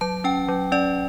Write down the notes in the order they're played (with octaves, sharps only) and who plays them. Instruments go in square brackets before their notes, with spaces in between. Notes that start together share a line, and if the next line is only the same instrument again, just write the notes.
[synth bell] F#3 A5
C#4 G5
F#3
C#4 D5